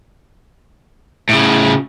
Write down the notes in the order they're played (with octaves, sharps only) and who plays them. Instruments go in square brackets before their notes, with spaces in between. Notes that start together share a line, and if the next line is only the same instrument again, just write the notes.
[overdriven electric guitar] A2 C#3